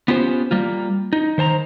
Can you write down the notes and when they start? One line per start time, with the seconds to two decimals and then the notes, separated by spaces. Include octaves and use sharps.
0.08 B3 C#4 F4 G4 C5
0.51 G3 A#3 F4
1.13 D#4
1.38 D#3 C5 A5 A#5